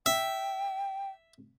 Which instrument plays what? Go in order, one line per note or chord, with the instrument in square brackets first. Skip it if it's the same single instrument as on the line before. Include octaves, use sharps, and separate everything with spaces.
[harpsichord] E5 [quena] G5